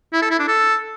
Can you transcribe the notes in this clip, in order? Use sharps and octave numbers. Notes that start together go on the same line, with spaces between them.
E4
A4
E4
D4
A4